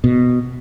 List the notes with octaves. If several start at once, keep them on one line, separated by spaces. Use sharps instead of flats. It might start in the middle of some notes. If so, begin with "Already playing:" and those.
B2